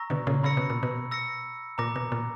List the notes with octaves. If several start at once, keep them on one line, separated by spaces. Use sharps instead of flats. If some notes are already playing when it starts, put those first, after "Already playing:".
Already playing: A#5 C#6 E6 A#6
B2 D3
A#2 C#3
C#3 B5 E6 A#6 C#7
B2
A#2
B2
E6 A#6 C#7
A#2 A#5 D6 A#6
B2
A#2